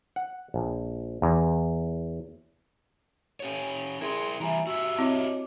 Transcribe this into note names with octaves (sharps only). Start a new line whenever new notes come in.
F#5
A#1
E2
C#4 G4 C#5
E4 G#4 A#4 C6
E3 G3 E5 G#5 A#5
F#4 G4 E5 E6
C4 E4 C#5 D#5 D6